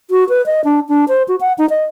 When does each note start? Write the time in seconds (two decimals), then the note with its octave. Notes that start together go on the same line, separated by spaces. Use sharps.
0.11 F#4
0.29 B4
0.46 D#5
0.64 D4
0.89 D4
1.08 C5
1.28 F#4
1.41 F#5
1.58 D#4
1.70 D#5